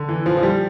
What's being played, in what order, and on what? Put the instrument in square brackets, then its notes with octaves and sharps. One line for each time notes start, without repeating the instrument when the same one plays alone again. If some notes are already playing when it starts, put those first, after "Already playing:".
Already playing: [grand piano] D3
E3
F3
F3
G3